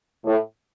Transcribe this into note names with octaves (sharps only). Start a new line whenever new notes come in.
A2